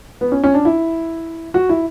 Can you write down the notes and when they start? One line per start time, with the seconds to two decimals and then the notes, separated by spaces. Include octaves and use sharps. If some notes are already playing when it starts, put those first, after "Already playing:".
0.21 B3
0.32 C#4
0.44 C#4
0.54 D4
0.65 E4
1.54 F#4
1.69 E4